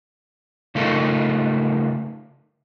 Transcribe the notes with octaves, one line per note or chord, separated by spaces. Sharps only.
C#3 A3 D#4 F4 A4 A#4